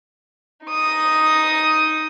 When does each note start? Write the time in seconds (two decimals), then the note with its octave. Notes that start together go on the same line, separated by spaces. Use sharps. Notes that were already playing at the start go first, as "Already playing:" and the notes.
0.66 D#4 D#6